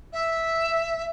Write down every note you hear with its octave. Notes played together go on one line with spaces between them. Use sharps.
E5